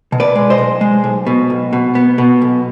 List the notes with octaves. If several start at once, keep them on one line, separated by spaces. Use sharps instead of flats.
B2
B4 D5
G#3
C5 D#5
B1
G#3
B1
B2
B1
B2
B3
B2
B1